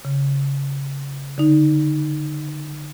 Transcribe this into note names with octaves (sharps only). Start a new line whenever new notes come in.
C#3
D3 D#4